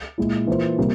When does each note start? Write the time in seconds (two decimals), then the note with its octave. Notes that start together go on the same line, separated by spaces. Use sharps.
0.18 A#2 G#3 E4
0.47 E3 A#3 F4 C5
0.78 C3 G3 A#3